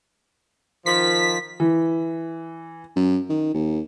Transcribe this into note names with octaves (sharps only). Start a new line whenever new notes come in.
D#3 F3 B6
E3
F#2
D#3
D#2